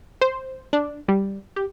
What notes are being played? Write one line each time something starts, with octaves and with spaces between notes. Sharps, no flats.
C5
D4
G3
G4